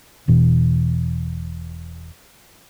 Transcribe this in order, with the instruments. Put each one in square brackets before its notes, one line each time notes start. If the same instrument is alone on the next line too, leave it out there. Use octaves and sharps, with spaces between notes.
[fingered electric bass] E1 B2 E3